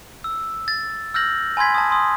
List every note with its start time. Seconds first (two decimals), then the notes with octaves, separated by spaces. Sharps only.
0.24 E6
0.68 A6
1.14 E6 F6 G6 A#6 F#7
1.57 G#5 B5 C6 G#6 B6
1.75 A5 D#6
1.90 G#5 C6 D#6